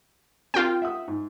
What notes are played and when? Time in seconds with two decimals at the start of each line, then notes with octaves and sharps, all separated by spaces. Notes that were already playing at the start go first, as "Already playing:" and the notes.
0.54 C4 D4 F4 A#4 G5
0.82 E5 F#5 D#6
1.08 G#2